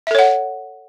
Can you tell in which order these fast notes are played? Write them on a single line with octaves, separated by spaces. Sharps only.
E5 A4 C#5 F#5